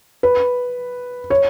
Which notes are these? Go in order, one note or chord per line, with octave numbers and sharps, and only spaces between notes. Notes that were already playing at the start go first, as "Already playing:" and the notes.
B4
C#5